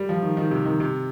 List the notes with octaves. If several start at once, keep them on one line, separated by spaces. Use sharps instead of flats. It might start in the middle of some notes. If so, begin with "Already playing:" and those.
Already playing: G3
F3
D#3
D#3
C3
D#3
C3